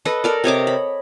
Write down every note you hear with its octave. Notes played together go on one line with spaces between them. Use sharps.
A4 B4 D#5
A4 A#4 D5
C3 C#5 D#5 D6
B5